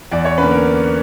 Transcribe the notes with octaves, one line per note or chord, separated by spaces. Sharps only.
E2 D5
C#5
D3 A#3 C#4 B4
A#4